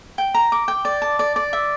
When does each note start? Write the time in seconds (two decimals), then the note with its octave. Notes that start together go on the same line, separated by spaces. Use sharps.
0.18 G5
0.34 A#5
0.52 D6
0.68 G5
0.85 D5
1.02 A5
1.19 D5
1.36 D5
1.53 E5